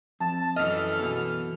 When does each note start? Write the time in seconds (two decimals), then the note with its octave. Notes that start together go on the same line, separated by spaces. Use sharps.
0.20 F2 A5
0.56 F#2 E3 A4 D#5 F6
0.99 E2 B2